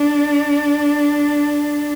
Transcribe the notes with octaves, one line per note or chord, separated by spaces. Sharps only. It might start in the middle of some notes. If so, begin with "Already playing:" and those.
Already playing: D4